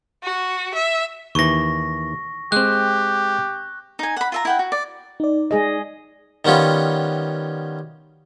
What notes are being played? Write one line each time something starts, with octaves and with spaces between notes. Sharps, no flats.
F#4
E5
D#2 E3 C#6 A#6
G#3 C4 G4 F#6
D#4 G#5
F#5 B5
F4 E5 A#5
E4 F#5 G5
F#4
D5
D#4 D5
G#3 G#4 D#5
D#3 G3 B3 C#4 F4